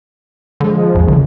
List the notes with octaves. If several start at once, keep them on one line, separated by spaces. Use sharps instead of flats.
D3 F3 G#3
A#1 D#2
A#1 C#3